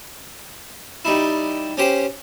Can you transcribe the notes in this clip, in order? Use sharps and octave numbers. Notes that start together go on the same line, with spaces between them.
G3 D#4 E4
C#4 G4 C5